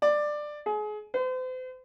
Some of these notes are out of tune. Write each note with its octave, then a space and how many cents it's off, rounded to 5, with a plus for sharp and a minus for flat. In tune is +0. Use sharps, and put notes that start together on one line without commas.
D5 +15
G#4 +30
C5 -40